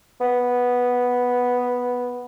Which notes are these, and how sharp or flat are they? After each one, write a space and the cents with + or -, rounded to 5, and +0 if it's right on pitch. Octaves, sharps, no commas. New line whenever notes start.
B3 -5